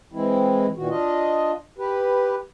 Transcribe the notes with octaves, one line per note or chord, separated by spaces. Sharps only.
E3 G#3 C4 E4
A#2 D#3 E3 F#4
D4 F4 D#5
G4 B4